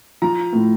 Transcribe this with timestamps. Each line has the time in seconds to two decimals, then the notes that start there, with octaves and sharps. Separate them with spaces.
0.22 F3 A#5
0.53 A2